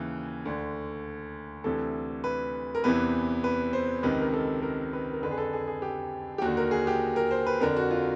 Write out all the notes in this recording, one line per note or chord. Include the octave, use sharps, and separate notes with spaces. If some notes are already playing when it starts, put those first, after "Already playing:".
Already playing: D#2 C#3 E3
D2 D3
D2 C3 E3 A4
B4
A#4
E2 C3 E3 B4
B4
C5
C#2 C3 D#3 B4
A#4
A4
A#4
B4
A#4
F2 D3 B4
G#4
A4
G#4
G#4
G4
G4
D#2 D3 F#4
A#4
G#4
G4
A#4
C5
B4
F2 D3 A#4
F#4
F4